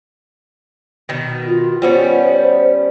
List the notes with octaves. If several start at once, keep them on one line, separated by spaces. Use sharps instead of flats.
B2 D#3
F4
G3 B3 C#4 C5